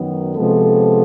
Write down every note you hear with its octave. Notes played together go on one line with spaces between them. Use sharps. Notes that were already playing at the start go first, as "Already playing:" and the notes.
Already playing: F#2 D#3 F#3 B3
C3 F3 G#3 B3 A4